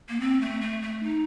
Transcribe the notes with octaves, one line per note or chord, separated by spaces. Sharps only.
A#3
C4
A3
A3
A3
D#4